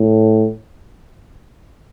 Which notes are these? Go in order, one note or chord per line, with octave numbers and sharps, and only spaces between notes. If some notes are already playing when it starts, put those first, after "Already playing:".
Already playing: A2